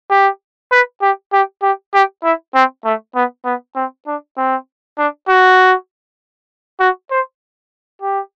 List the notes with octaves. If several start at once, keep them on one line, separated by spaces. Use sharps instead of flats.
G4
B4
G4
G4
G4
G4
E4
C4
A3
B3
B3
C4
D4
C4
D4
F#4
F#4
C5
G4